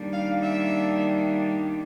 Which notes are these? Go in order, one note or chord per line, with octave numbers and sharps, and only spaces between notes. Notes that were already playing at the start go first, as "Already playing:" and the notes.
Already playing: D#3 G3 A#3 D4
F5
E5